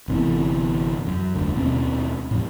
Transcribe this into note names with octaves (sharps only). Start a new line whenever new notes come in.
G1 C3 E3 B3
F#2
F1 D2 G2
D#2 B2 C4 C#4
A2 F3